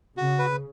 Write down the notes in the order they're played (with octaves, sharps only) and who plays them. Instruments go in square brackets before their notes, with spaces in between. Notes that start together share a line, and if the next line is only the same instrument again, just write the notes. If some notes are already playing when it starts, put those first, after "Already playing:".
[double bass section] C#3 [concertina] F#4
[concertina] B4